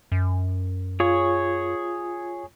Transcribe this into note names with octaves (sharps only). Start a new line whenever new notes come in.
F#2
F4 G#4 C#5